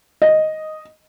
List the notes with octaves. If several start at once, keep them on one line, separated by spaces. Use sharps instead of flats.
D#5